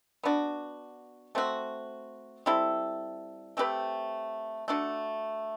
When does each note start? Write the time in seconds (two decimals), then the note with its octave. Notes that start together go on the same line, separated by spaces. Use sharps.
0.23 B3 D4 F#4
1.35 A3 C4 F#4
2.46 G3 C4 E4 A4
3.57 A3 C4 G4 B4
4.68 A3 D4 F#4